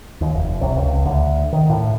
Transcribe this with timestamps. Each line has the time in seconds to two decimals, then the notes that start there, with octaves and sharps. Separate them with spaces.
0.21 D#2
0.34 F1
0.61 C2
0.77 C#2
1.05 D2
1.53 D#3
1.70 A2